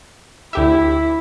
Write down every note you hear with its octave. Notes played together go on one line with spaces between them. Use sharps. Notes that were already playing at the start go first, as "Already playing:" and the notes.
D2 E4 G4 E5